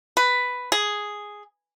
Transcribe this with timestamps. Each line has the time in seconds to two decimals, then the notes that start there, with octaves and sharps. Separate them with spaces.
0.17 B4
0.72 G#4